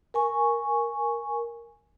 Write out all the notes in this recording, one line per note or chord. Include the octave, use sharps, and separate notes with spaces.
A#4 G#5 C#6